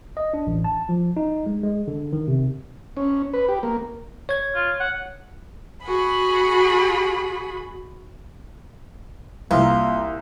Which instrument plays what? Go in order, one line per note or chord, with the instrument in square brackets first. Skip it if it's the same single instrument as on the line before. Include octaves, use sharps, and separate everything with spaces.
[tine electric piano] D#5
D4
A1
A5
F3
D#4
G#3
G#3
D3
D#3
C3
[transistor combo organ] C#4
B4
G4
A#3
[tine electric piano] C#5 G#6
[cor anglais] F4
F#5
[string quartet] F#4 G#4 B5
[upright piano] C2 [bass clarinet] A#3 [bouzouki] F4